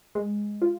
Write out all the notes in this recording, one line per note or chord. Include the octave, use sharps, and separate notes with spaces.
G#3
F4